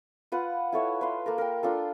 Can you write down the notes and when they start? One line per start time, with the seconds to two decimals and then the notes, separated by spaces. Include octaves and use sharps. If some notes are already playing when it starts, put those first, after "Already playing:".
0.32 F4 B4 F#5
0.72 E4 A4 C#5 E5
1.01 B4 F5 C6
1.26 A#3 A4 A#4
1.38 A#4 G5
1.63 D4 F4 A4